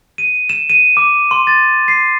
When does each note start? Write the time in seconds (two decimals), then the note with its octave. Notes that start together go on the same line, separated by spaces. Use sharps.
0.18 D#7
0.50 E7
0.70 D#7
0.97 D6
1.31 C6
1.47 A6
1.88 C7